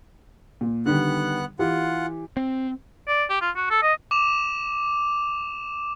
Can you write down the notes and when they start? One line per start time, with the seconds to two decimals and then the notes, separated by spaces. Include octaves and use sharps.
0.61 A#2
0.86 D3 D#3 G3 B3 F#5 F#6
1.59 E3 F4 G4 F#5
2.37 C4
3.08 D5
3.30 G4
3.41 F4
3.56 F#4
3.70 A4
3.82 D#5
4.11 D6 E7 F7